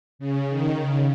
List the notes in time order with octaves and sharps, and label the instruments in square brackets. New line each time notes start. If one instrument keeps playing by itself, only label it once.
[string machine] C#3
D#3
C#3